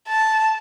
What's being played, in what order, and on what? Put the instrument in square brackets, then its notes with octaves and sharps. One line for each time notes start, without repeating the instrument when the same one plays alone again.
[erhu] A5